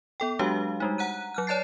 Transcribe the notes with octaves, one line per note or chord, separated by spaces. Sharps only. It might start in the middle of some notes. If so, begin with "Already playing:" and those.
B3 A4 G5
F#3 G#3 D4 F#4 G4 F5
G3 G#3 D#4
F#5 A#5 F#6 D#7
F#3 F6 F#6
C#5 D5 A5 A6 C7